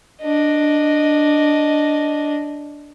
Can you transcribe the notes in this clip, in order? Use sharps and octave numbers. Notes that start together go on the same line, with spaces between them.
D4 D#5